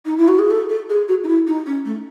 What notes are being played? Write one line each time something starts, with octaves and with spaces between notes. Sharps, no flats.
D#4
E4
F#4
G#4
A4
A4
G#4
F#4
D#4
E4
D#4
C#4
A3